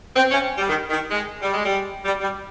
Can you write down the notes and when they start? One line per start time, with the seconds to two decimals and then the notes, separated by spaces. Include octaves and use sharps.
0.16 C4
0.31 C#4
0.58 G3
0.69 D#3
0.90 D#3
1.11 G#3
1.42 G3
1.54 G#3
1.66 G3
2.05 G3
2.21 G3